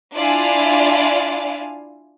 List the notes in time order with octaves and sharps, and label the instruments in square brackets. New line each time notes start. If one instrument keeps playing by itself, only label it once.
[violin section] D4 E4 F4 D5 F5 G#5